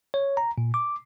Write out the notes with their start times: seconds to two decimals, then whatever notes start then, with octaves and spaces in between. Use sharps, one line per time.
0.14 C#5
0.37 A#5
0.58 A#2
0.74 D6